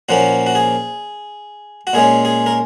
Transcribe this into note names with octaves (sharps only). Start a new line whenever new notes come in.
A#2 F3 A#3 C#4 F#4
F#4
G#4
F#4
A#2 G#3 C#4 G#4
G#4
A#4